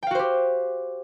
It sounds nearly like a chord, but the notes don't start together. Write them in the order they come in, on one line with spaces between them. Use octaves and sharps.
G5 F5 F#4 C5 G4